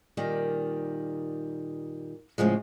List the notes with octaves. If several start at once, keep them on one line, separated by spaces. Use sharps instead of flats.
A#2 D#3 G3
A2 C#3 F3 G#3